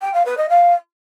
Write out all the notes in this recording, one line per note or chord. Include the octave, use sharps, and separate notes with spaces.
G5
F5
B4
D#5
F5